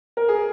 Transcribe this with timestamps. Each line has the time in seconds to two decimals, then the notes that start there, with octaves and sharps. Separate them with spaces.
0.17 A#4
0.28 G#4